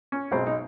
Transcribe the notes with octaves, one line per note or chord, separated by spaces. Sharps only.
C#4
B1 B2 G#3 C4
D#4